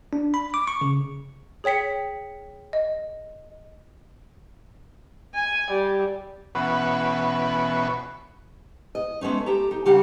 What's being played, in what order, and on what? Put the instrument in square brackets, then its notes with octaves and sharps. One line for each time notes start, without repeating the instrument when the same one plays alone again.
[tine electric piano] D4
B5
D6
C#6
C#3
[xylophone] G#4 C#5 G5 B6 C#7
D#5
[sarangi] G#5
G3
[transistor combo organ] B2 E3 B3 C#4 F#4
[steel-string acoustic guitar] D#5
G#3 A3 B3 C#4 D#4
G4 A4 A#5
D#4
C#3 G3 D4 G4 F#5 A#5